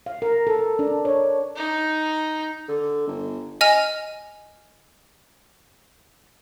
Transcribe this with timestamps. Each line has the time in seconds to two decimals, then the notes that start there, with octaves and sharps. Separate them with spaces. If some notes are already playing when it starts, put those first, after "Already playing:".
0.06 F5
0.22 A#4
0.47 A4
0.79 D4
1.05 C#5
1.56 D#4
2.68 D3
3.07 G1
3.61 D#5 G#5 F6 F7